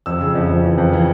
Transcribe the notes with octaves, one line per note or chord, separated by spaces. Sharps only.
F2 E6
C#3
F2
F2
E3
F2
E3